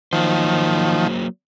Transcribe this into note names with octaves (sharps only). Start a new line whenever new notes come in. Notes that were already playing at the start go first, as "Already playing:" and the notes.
D#3 F3 F#3 A#3 C5